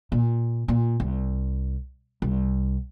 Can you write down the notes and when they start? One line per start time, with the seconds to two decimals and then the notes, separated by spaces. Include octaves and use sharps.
0.12 A#2
0.68 A#2
1.00 C2
2.22 C2